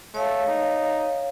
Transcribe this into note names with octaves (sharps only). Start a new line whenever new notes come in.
A3 C#5 F5
D#4